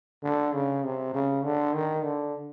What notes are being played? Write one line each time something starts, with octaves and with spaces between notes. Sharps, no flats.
D3
C#3
C3
C#3
D3
D#3
D3